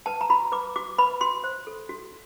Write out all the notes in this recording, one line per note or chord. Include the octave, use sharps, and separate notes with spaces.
B4 A5
A#5
F#4 B5
B4 D6
F#4 D6
B4 B5
F#4 C6
C5
A4
F#4